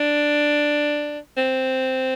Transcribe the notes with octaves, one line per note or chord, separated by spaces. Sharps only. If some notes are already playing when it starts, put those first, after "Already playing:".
Already playing: D4
C4